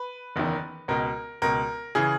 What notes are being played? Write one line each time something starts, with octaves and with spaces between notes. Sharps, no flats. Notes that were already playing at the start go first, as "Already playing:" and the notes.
Already playing: B4
F#1 E2 D#3
C#2 B2 A#4
C#2 B2 A#4
C#3 E3 G#4